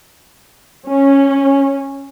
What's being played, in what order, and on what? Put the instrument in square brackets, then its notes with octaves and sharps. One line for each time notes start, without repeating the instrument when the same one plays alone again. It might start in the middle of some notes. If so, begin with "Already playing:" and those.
[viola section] C#4